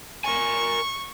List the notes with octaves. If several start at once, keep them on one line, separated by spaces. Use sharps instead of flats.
A#4 G#5 C#6